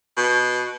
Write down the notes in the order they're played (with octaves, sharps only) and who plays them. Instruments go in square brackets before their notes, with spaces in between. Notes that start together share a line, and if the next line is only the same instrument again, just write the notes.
[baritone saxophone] B2